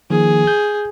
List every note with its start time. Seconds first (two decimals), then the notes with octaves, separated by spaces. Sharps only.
0.10 D#3 F3 A#3 G#4
0.47 G6